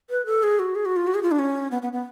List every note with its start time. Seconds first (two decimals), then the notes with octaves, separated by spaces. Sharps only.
0.10 B4
0.26 A4
0.43 G#4
0.59 F#4
0.75 G#4
0.85 F#4
0.96 F4
1.07 F#4
1.15 G#4
1.23 F4
1.31 D4
1.39 C#4
1.71 B3
1.82 B3
1.93 B3